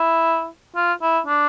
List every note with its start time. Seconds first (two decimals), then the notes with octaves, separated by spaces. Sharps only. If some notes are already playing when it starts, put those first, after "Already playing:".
Already playing: E4
0.76 F4
1.02 E4
1.26 D4